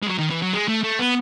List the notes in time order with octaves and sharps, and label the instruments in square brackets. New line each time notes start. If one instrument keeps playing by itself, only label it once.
[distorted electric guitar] G#3
F#3
D#3
E3
F#3
G#3
A3
A3
B3